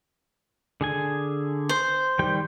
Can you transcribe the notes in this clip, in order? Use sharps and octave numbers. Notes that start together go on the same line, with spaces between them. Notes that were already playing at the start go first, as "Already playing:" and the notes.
D3 G#4 G#5
C5
D#3 G3 G5